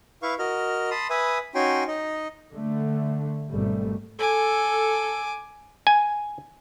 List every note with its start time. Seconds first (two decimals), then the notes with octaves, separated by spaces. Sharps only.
0.23 E4 B4 F5 C#6
0.39 F#4 A#4 D#5 F6
0.91 A5 B5 C6 D#6
1.10 B4 E5 G#5 B5 D#6
1.55 C#4 D#4 F#4 G5 G#5 C6
1.88 D#4 D#5
2.53 D3 A3
3.50 G#1 B2 G3 A3
4.19 A4 G#5 D6
5.87 G#5